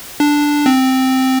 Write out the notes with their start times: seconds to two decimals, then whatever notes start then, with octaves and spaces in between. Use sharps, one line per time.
0.20 D4
0.66 C4